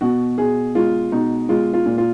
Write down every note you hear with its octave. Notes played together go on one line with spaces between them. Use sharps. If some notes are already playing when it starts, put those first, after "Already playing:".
B2 F#4
B2 G#4
G#3 F4
B2 D#4
G#3 F4
F4
A#2
F4